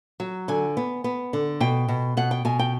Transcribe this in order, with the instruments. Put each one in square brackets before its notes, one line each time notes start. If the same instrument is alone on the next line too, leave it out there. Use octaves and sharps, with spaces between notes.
[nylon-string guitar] F#3
D3 G#5
B3
B3
D3
B2 G5
B2
B2 F#5
G5
B2 G#5
G5